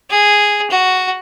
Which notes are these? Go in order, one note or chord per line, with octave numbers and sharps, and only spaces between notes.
G#4
F#4